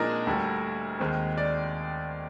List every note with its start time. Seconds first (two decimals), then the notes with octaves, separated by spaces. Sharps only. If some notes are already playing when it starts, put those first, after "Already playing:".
Already playing: A#2 F3 G#3 C4 D4 D#4 G#4 A#4
0.27 D2 D3 G3
1.00 D#2 D#3 G#3 C4
1.38 D5